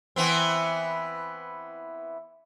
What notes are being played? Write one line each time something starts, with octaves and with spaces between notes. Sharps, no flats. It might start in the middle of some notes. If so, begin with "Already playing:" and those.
E3 B3 C4